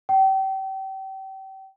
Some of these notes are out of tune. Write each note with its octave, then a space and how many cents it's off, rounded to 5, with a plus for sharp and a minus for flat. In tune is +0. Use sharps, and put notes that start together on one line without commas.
G5 -35